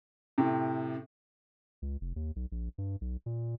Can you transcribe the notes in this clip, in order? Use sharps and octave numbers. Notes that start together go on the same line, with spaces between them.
A2 C3
C#2
F1
D#2
B1
A#1
G2
B1
A#2